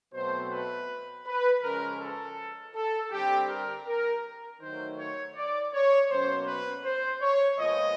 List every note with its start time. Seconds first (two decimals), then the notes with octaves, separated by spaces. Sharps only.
0.13 B2 F#3 A3 C4 C5
0.51 B4
1.26 B4
1.62 C#3 F3 G#3 C#4 A#4
2.00 A4
2.75 A4
3.12 D3 G3 C4 G4
3.49 A#4
3.86 A#4
4.60 D#3 F#3 A3 C5
4.98 C#5
5.36 D5
5.73 C#5
6.10 B2 F#3 A#3 C#4 C5
6.47 B4
6.85 C5
7.21 C#5
7.58 A#2 F3 G#3 B3 D#5